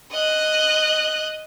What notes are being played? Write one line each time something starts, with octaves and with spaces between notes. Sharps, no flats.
D#5 F#6